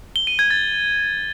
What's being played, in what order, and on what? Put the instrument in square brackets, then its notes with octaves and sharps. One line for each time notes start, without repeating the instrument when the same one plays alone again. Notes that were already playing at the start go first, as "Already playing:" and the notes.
[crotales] G7
D#7
G#6
A6